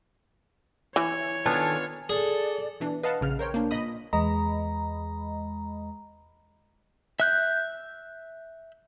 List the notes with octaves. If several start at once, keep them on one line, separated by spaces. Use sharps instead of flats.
E3 C#5
D#3 B3 D4 F4 A4 G#5
G#4 A4 D5
B2 E3 D4
B4 D#5 F5 F#5 A5
A#1 C#3 F6
A#4 C5 C#5 G5
A#3 D4
A#2 D#5 B5 D#6
E2 G#3 D#5 A#5 B5
E5 F#6 G6